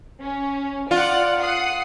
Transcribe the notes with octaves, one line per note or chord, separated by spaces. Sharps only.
C#4
F4 D5 F#5
F#5 D#6 C7